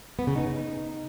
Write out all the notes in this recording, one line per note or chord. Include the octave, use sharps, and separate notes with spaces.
B3
C#3
D#4